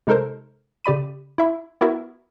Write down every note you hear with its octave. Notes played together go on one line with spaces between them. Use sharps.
C3 G#3 D#4 A4 A#4 C5
C#3 G4 D5 B5 D#7
E4 E5 B5
B3 E4 F#4 A#4 E5